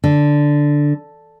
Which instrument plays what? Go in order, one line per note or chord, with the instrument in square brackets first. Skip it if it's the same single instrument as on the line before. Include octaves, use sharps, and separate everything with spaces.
[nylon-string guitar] D3